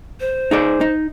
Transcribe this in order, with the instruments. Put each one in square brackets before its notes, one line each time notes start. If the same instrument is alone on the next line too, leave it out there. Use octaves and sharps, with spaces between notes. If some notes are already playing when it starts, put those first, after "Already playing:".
[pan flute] C5
[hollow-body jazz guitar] D#4 G#4 D5
D#4